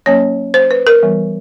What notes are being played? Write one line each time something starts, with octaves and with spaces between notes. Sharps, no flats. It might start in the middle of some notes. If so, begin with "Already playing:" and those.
F#3 A#3 C#4 C#5
C5
B4
A#4
E3 G3 B3